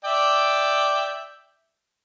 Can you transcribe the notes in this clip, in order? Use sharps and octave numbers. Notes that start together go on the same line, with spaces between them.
D5 E5 G5